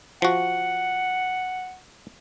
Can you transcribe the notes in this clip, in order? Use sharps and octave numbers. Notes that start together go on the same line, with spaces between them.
F3 F#4 F#5